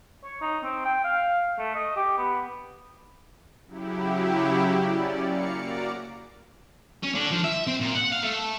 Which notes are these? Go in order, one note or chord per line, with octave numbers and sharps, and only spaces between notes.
C#5
D#4
C4
G5
F5
A3
D#5
G4
B3
C#3 F#3 E4 G4
C#4 D5
A#3 F5 C#7
F#4 D5 A#5 D6
C#4
D3
F3
E5
C4
A#2
F#5
F5
A3